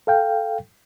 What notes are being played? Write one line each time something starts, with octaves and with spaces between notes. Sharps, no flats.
A4 F5 G5